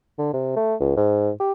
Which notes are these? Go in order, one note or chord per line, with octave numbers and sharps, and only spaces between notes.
D3
C3
A3
C#2
G#2
G4